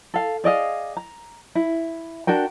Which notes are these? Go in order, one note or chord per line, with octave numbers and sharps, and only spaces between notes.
A4 F5
G#4 D5 D#5 F5
A#5
E4
D4 F#4 A#4 G5